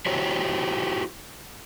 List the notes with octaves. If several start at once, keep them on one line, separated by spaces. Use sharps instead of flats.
E4 F#4 G4 C5 C#5